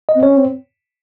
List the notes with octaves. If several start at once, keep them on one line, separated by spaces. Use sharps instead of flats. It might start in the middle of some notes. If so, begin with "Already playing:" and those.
D#5
C4
C#4 C#5
C4